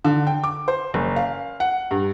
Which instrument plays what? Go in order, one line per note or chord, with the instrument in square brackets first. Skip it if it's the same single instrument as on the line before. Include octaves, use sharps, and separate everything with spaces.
[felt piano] D3
G5
D6
C5
F#1
F5
F#5
G2